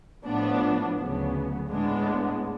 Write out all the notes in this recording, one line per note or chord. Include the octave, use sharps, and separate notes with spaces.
A2 F3 B3 D4
D2 C#3 F#3 B3
A2 G#3 B3 D4